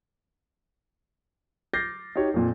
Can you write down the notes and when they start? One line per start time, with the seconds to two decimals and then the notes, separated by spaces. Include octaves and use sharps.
1.73 D6 F6 G6 A6 A#6 C7
2.16 D#4 F#4 G4 C#5
2.34 F2 A#2